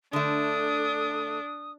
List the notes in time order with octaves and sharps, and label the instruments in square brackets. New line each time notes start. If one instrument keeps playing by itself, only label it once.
[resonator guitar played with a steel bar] D3 A3 [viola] D4 [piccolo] D#6